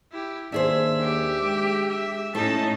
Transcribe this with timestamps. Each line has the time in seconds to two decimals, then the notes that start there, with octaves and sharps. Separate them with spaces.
0.12 E4 G4
0.52 D#2 D4 G#4 C5 E5
1.00 G4
1.42 G#3
1.89 E5
2.35 A2 A3 C#4 D#4 A5